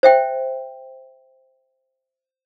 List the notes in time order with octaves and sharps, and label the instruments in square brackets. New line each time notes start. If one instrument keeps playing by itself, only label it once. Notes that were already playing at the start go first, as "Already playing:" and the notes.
[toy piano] C5 E5 G5